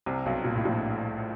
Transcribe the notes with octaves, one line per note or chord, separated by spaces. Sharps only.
C2 C3
B1 B2
A#2
A2
A#1 A#2